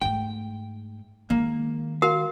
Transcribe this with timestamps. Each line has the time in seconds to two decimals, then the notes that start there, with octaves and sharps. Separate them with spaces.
0.01 G#2 A3 G5
1.30 D#3 G#3 A#3
2.02 F#4 A#4 F5